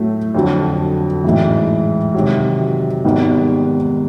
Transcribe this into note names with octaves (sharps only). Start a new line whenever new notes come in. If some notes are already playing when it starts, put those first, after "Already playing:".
Already playing: A2 F#3 A3
F2 D3 F#3
A1 G#2 E3
C3 D#3 F#3
G#1 G#2 D#3 G3 B3